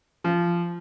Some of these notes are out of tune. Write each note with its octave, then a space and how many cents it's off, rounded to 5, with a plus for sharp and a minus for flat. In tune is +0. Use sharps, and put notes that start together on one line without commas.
F3 -15